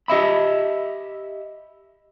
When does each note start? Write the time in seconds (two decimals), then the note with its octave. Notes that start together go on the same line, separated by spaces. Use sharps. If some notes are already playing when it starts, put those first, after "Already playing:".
0.08 G4 D#5 E5 B5